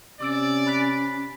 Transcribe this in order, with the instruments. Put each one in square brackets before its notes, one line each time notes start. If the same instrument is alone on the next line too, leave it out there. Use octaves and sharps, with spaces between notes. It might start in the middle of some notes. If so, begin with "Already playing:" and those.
[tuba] C3 [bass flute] C#4 [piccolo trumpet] D5 [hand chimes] D6 E6 D7
[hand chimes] B5 F#6 B6